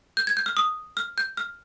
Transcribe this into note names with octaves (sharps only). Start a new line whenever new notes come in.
G6
G#6
G6
F6
D#6
F6
G6
F6